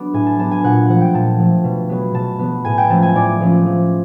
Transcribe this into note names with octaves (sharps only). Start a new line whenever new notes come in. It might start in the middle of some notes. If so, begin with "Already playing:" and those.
Already playing: F#3 B3 D4
A2 G#5
A5
F#3 B3 D4 A5
G#5
A#2 F#5
F3 A3 F#5
G5
A#2 A5
F3 A3
B2
F#3 B3
B2 A5
F#3 B3
A2 G#5
G5
F3 A3 C#4 A5
G#5
A2 D5
F3 A3 C#4
F3